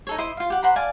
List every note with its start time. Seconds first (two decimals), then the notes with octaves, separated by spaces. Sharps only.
0.07 D#4 A4 C#5
0.18 E4 C5 D#5 C6
0.37 F4 F5
0.50 G4 F#5
0.62 C5 F#5 A#5 B5
0.76 D5 F5 G#5 A5